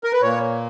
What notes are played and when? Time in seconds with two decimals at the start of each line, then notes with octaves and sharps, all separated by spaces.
0.04 A#4
0.13 B4
0.22 A#2 A#3 C#5